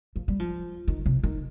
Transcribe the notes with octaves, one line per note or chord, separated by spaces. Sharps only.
F3
G3
F3
D#3
C3
D#3